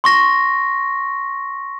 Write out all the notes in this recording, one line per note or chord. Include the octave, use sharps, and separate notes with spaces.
C6 C#6 A#6